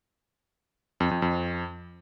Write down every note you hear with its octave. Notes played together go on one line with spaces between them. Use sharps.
F2
F2
F2